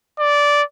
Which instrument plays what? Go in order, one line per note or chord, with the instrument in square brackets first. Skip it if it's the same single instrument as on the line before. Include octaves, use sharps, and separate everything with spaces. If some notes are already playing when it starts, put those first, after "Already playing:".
[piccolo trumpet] D5